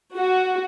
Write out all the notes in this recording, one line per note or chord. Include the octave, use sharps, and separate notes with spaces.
F#4